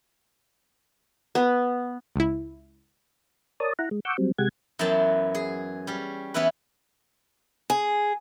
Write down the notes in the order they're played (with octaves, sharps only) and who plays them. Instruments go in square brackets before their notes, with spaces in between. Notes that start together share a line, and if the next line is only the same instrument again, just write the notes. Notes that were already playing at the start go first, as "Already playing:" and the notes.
[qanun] B3
[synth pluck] C#2 E4
[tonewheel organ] A#4 C#5 D5 A5 D#6
E4 F#5 A#5
G#3
F#5 C#6 D6 E6 G6
F#3 G3 C4
C3 G#3 G4 F#5 G#6
[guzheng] F#2 E3 F#3 B3 G5 A5
G#4
G3 C#4
E3 B3 C#4 E4 B4
[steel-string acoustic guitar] G#4